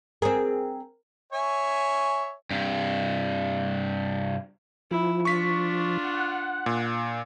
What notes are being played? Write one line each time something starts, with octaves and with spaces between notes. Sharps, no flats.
C4 G#4 A#4
C#5 E5 G#5
G2 C3
F3 E4
D4 F4 C#6 B6
F#5
A#2